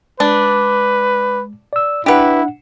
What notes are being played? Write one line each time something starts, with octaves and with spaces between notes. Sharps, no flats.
G#3 D4 B4
D5 E6
D4 E4 G4 B4 F#5